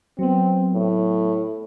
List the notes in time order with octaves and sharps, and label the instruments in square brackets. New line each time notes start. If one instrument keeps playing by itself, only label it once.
[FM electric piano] F#3 B3 [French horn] C4
[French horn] A2